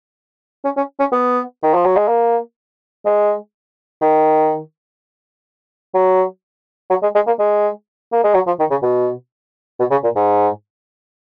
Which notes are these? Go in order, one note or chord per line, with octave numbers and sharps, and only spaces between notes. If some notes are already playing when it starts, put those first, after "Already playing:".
C#4
C#4
C#4
B3
D#3
F3
F#3
G#3
A#3
G#3
D#3
F#3
F#3
G#3
G#3
A#3
G#3
A#3
G#3
F#3
F3
D#3
C#3
B2
B2
C#3
A#2
G#2